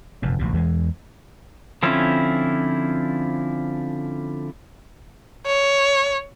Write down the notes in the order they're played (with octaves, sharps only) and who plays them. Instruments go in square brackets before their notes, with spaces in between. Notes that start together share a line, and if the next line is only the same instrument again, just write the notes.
[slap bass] F1 F#2 A#2
A1 D2 C3
E2 E3 F#3 G#3
[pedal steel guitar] D3 F3 C4 C#4 E4
[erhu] C#5